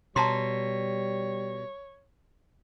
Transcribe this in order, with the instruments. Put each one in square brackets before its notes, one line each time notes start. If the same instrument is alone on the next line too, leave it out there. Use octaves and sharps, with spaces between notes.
[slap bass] B2 [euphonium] G3 [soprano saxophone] C#5 [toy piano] A5 A#5 C6